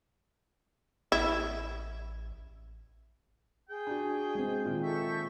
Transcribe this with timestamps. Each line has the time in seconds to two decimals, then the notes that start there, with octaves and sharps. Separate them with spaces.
1.12 A1 E4
3.70 G#4 G5
3.87 D4 F#4
4.35 G#3 C4
4.65 A#2 D#3
4.83 A4 E5 C#6 G6